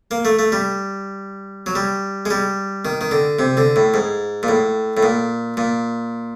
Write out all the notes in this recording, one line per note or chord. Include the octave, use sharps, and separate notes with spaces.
A#3
A3
A3
G3
F#3
G3
G#3
G3
D#3
D#3
D3
C3
D3
A2
G#2
A#2
A2
A2
A#2
A#2